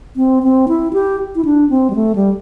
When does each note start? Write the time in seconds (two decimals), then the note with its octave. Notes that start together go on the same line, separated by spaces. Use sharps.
0.16 C4
0.43 C4
0.68 E4
0.93 G4
1.35 E4
1.45 D4
1.70 C4
1.90 G3
1.95 A3
2.15 G3